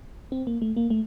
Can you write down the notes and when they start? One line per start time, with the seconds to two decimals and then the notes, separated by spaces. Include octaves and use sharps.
0.32 C4
0.47 A#3
0.62 A3
0.76 A#3
0.90 A3